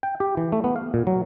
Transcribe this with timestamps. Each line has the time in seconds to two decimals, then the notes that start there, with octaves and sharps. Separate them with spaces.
0.03 G5
0.20 G4
0.37 E3
0.52 A3
0.64 B3
0.76 F5
0.94 A#2
1.07 F#3